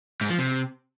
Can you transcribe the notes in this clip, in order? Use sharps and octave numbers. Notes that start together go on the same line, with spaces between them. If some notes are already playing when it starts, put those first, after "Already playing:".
G#2
F3
C3